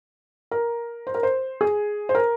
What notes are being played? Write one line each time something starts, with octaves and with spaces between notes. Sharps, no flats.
A#4
C5
A#4
C5
G#4
C5
A#4